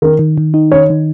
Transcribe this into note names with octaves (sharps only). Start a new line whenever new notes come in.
D#3 A#4
D#3
D#3
D#4
D#3 C#5
D#3